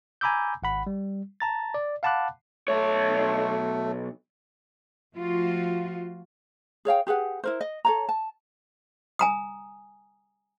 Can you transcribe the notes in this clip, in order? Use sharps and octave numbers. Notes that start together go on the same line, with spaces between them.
G#5 A#5 B5 D6 E6 G6
G#1 F#5 B5
G3
A5 A#5 A6
D5
F5 F#5 A5 B5 D6 F#6
B1 A3 C#5
F3 A3 F4 F#4
G#4 C#5 F5 G5
G4 G#4 B4 F#5
E4 A#4 C5
D#5
A4 C#5 A#5
A5
G#5 A#5 D#6